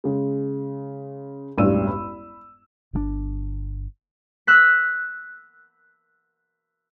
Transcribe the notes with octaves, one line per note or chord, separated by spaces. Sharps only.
C#3 G#3
E1 A1 G2 E6 D#7
B5
G1 C#3 D4
E6 F#6 B6